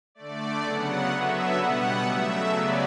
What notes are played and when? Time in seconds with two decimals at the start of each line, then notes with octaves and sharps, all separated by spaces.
0.15 D3 A3 D5
0.62 C#3 F#3 B3 F#5
1.09 D3 F#3 B3 E5
1.56 B2 G3 B3 F#5
2.03 C#3 F#3 A3 E5
2.50 C#3 F#3 B3 D5